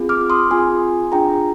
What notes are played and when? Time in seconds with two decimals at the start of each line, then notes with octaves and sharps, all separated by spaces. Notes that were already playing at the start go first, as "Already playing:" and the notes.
Already playing: C4 F4 G#4
0.09 D6 F6
0.30 C6 D#6
0.51 C4 F4 G#4 G#5 C6
1.12 D4 F4 G#4 G5 A#5